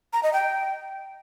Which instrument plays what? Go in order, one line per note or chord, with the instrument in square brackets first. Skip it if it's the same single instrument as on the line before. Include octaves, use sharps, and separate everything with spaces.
[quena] A#5
D#5
G5